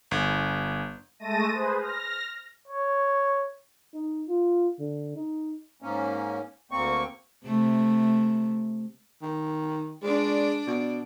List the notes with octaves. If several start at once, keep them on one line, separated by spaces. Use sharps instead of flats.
G1
G#3 A3 A5 A#6 D#7
G#4 B4 C5
F6 A#6
C#5
D#4
F4
D3
D#4
G#2 A#3 C#4
D2 A#3 C4 C#6
C3 A3
D#3
G#3 D4 D5
B2